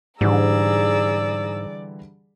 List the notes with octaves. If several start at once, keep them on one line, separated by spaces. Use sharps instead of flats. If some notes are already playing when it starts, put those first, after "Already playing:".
G#2 D3 E3 G3 G#4 D5 A#5 E6